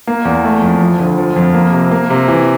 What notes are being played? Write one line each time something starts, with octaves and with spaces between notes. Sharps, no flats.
A#3
E2
A3
F2
F3
D2
F3
F2
A#3
C3
A#3
C3
E3